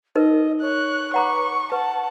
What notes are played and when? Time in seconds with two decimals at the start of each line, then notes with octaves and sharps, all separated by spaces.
0.15 D#4 A#4 B4 D#5
0.62 C#5 F#6
1.14 B4 F#5 A#5 C#6 D6
1.72 B4 F#5 A5